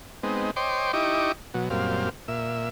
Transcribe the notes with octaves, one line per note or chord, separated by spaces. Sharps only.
G#3 B3 C4 D#4
C5 C#5 D#5 G5 C6 D6
D#4 E4 G4 D#5 C#6 D6
B2 F#3
F#2 A#2 G3 C4 F5
A#2 E5